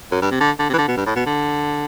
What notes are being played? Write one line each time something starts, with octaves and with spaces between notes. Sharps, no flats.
F#2
G2
C3
D3
D3
C3
E3
D3
B2
G2
A2
B2
D3